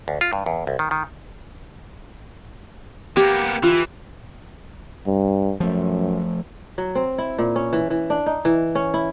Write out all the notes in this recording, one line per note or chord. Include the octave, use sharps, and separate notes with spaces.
D2
F4
G2
E2
C2
D#3
D#3
A#3 B3 G4
E3 F4
G2
F#2 F3 A3
F#3
C4
E4
A#2
C#4
E3
E3
D4
D#4
E3
C#4
E4